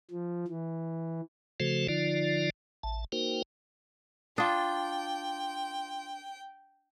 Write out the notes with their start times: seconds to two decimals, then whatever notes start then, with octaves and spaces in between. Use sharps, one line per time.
0.11 F3
0.48 E3
1.60 C#3 F3 A3 F#4 A4 C5
1.89 D3 F3 D#4 F4 D5
2.83 A1 A5
3.12 A#3 D#4 F#4 A#4 C5 G5
4.38 D4 F4 G5 D#6